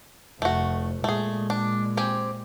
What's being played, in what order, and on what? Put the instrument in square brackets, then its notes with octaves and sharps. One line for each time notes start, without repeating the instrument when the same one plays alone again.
[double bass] F1 F2 [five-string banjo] A3 F#4
[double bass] A#2 G#3 [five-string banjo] A3 G#4
[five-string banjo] D4
C4 G4 G#5